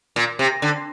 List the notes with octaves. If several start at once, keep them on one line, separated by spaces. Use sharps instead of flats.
A#2
C3
D3